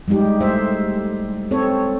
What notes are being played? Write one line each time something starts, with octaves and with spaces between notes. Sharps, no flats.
G3 G#3 D#4 G4
A3 C5 E5
C4 A4 C#5